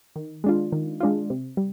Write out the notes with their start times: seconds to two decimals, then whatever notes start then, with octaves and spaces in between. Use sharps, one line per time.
0.16 D#3
0.44 G#3 D4 F4
0.72 D#3
1.00 G#3 D4 F4
1.30 C3
1.57 G3